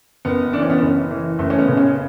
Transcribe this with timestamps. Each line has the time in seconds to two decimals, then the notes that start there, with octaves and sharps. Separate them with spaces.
0.25 F#1 B3
0.53 E3 D4
0.62 C#4
0.70 B3
0.78 F#1 C#4
1.11 E3
1.39 F#1 A3
1.50 C#4
1.58 B3
1.68 C#3
1.77 C#4